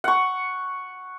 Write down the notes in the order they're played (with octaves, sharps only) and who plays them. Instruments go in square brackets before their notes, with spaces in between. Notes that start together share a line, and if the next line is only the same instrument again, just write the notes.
[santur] F#5 C#6